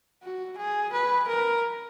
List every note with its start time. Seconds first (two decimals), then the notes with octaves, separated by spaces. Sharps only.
0.23 F#4
0.58 G#4
0.93 B4
1.28 A#4